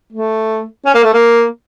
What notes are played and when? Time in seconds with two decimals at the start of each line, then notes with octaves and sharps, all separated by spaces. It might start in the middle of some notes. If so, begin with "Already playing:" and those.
0.13 A3
0.86 C#4
0.95 A#3
1.04 A3
1.14 A#3